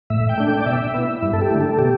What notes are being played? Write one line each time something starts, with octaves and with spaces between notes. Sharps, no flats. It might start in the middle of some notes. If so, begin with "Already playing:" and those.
A2 E5
G5
A3 D4
G5
D5
B2 E5
B3 E4
G2 E4
A4
G4
D3 A3
A4
B2 G4